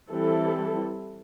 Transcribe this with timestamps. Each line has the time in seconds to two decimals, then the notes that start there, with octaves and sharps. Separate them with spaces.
0.10 E3 G3 C4 E4 A4